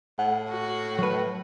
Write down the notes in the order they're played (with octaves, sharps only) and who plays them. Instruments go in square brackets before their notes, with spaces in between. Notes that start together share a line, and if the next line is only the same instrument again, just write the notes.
[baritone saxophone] A2 [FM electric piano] F#5
[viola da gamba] F#4
[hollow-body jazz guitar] F#3 B4